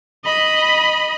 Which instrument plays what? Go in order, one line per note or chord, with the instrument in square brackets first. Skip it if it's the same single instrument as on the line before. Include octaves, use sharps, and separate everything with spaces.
[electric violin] D#5 B5